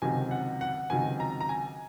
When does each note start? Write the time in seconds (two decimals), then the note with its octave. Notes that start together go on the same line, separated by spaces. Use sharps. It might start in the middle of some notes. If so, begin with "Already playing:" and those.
0.02 C#2 C3 D#3 F#3 G#5
0.31 F#5
0.61 F#5
0.90 C#2 C3 D#3 F#3 G#5
1.20 A#5
1.40 A#5
1.49 G#5